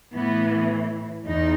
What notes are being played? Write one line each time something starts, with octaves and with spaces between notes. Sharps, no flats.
A2 E3 B3
E2 D#4